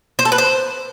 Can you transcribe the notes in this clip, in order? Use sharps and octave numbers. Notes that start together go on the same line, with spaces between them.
C5
A4
B4
C5